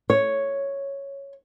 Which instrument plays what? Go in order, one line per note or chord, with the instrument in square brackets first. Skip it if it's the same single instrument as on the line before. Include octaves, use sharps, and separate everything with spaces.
[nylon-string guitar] C#5